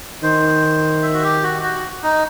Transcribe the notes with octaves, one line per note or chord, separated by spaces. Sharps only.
D#3 C5
E5
F#4
G4
F#4
F#4
D#4